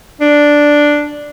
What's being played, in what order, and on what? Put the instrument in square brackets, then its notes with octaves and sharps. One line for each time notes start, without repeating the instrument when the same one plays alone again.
[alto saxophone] D4